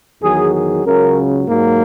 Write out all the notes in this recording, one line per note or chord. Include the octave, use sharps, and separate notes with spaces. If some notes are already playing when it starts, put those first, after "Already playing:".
E2 D#3 F#3 G#4
G#4
C#2 C#3 F#3 A#4
G#2 F#3 A#3